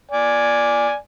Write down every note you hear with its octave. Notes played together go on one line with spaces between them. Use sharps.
D5 G#5